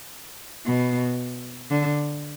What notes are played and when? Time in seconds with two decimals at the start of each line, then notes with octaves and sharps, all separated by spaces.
0.66 B2
1.71 D3